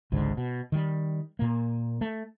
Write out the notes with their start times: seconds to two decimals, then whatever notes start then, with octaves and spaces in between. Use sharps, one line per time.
0.12 G#1 C#2 G#2 D3
0.37 B2
0.72 D#3 G3
1.39 A#2 A#3
2.01 A3